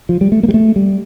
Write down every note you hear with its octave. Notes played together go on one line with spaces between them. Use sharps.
F3
G3
A3
A#3
G3
A3
G3